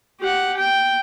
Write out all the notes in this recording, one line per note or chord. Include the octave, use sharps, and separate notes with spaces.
G4 F#5
G5